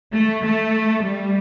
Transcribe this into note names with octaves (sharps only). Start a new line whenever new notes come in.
A3
A3
G3